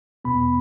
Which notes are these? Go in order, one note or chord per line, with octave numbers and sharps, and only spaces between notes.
E2 B2 B3 B5